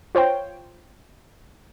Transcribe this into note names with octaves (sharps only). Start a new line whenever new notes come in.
F4 C5 C#5 G5